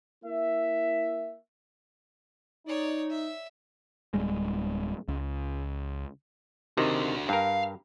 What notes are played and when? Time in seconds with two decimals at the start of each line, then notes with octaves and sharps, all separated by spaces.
0.25 A#3 E4 E5
2.67 D#4 C#5 D5
3.10 E5
4.14 D1 G3 G#3
5.08 C#2
6.77 C3 D#3 D4 F#4
7.29 G2 A#4 F5